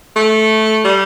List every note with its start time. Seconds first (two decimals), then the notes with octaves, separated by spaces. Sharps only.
0.16 A3
0.85 G3